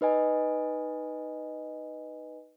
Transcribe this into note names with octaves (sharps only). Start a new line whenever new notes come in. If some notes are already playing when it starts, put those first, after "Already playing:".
D#4 B4 D#5 G#5